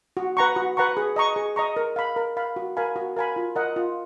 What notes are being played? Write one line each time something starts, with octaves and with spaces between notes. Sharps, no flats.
F#4
B4 F#5 A#5 C#6
F#4
B4 F#5 A#5 C#6
G#4
D#5 A#5 C#6
G#4
D#5 A#5 C#6
A#4
F5 B5
A#4
F5 B5
F#4
A#4 F5 G#5 B5
F#4
A#4 F5 G#5 B5
F4
A#4 D#5 F#5
F4